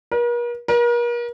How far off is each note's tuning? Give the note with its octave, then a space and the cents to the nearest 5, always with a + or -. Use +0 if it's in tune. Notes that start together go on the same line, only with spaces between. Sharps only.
A#4 +45
A#4 +40